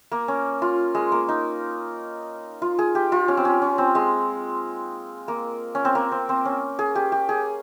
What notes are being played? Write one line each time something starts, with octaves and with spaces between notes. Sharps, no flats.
A#3
C#4
F4
G#3
A#3
D#4
F4
G#4
G4
F4
C#4
C4
C#4
C#4
C4
G#3
A#3
C#4
C4
A#3
C4
C4
C#4
G#4
G4
G4
G#4